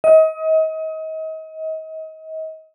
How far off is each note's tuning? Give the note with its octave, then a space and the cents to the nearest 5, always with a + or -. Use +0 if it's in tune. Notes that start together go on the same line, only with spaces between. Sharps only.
D#5 +35